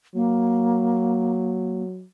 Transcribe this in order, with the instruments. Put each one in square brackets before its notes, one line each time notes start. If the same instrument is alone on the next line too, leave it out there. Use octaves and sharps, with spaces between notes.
[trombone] F#3 [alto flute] A#3